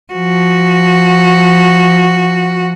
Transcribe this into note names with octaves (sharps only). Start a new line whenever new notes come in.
F3 F#4